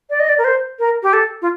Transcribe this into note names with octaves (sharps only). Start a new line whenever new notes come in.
D5
D#5
D5
A#4
C5
A#4
G4
A4
F4